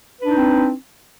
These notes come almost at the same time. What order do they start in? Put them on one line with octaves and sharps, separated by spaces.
B4 D4 D#4 C4